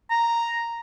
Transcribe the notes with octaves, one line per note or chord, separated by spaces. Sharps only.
A#5